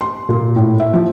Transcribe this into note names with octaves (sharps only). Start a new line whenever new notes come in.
C6
A#2
A2
E5
F3